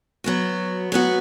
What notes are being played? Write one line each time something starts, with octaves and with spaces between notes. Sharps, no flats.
F#3 B3 F#4
F#3 B3 F#4